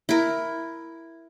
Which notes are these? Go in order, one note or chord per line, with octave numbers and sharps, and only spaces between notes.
E4 A#4